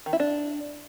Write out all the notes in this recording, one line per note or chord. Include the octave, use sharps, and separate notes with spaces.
D#3
E4
D4